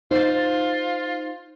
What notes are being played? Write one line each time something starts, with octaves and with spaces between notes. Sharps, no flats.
D#4 F4 C5 A6